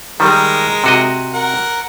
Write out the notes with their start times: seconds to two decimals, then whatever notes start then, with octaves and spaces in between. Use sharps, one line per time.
0.20 D#3 G3 G#3 A#4
0.84 C3 F#4 D#5
1.34 A#4 F#5